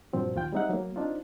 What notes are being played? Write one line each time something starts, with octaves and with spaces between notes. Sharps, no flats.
G2 A#2 F3 C4 F#4
D#2 F4 G5
G3 G#3 C4 D#4 E5 F#5
F#3 A#3
C4 D4 D#4 F4